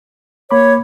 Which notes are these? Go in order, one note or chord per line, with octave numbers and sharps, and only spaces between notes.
A#3 C#5 B5 D6